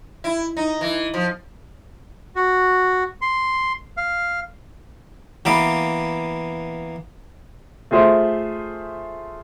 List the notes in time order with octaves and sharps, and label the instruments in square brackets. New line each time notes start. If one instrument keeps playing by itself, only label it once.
[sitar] E4
D#4
E3
F3
[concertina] F#4
C6
F5
[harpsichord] E3 A#3 B3 F5 B5 D6
[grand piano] A3 F4 G#4 C5 E5